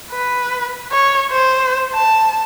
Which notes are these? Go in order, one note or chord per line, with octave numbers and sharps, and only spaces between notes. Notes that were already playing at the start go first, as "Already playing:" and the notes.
B4
C#5
C5
A5